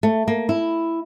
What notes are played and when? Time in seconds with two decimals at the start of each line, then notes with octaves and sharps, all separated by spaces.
0.03 A3
0.28 A#3
0.49 E4